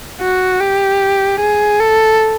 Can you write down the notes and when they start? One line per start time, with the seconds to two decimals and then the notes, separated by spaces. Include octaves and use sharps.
0.21 F#4
0.60 G4
1.40 G#4
1.80 A4